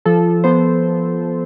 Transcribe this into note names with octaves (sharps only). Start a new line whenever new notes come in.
F3 A4
B3 C5